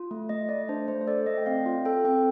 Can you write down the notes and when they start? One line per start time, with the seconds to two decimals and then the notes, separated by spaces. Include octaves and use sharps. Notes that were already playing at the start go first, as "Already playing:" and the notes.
Already playing: F4
0.11 A3
0.29 A3 D#5
0.49 A3 D5
0.69 D4 C5
0.88 A3 C5
1.01 C5
1.07 A4 D5
1.26 A3 D#5
1.38 G5
1.46 C4 F5
1.66 F4 G5
1.85 A4 G5
2.04 C4 G5